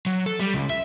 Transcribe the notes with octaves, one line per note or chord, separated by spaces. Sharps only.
F#3
A4
G3
C#2
E5